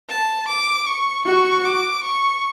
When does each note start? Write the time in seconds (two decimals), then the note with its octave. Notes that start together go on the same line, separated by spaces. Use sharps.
0.09 A5
0.48 D6
0.86 C#6
1.25 F#4 C#6
1.64 D6
2.03 C#6